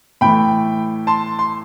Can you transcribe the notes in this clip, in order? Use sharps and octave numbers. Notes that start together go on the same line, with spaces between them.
A2 E3 A3 G5 B5
A5 C6
C6